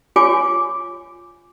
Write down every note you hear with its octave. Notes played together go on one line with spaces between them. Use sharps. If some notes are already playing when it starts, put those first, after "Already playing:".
F4 G4 C#5 G#5 D6